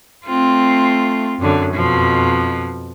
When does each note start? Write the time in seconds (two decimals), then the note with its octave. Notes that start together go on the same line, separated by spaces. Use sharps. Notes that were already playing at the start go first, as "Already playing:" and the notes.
0.26 A3 C4 F4
1.38 F#2 D3
1.75 F2 B2 F3